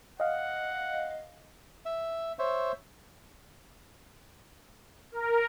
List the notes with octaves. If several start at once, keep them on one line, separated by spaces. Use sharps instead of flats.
D#5 F5 F#5
E5
C5 C#5 E5
A#4